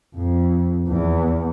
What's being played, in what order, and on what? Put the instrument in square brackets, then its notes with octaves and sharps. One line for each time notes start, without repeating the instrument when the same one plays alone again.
[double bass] F2
E2